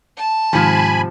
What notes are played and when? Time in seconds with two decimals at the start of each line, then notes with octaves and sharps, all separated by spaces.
0.18 A5
0.53 G#2 C3 D#3 F3 G#5 B5